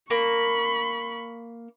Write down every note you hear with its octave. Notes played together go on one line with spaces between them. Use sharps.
A#3 B5 C#6